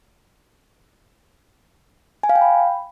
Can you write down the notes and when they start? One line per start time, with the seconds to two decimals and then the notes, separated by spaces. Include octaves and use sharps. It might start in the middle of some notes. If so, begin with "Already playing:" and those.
2.23 G#5
2.29 F5
2.35 G5
2.41 B5